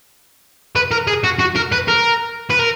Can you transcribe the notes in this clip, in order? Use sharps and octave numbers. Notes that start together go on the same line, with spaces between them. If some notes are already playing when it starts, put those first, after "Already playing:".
B4
A#4
G#4
F#4
F#4
A#4
B4
A#4
B4
A#4